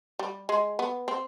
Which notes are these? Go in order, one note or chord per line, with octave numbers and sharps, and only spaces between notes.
G3
G#3
B3
C4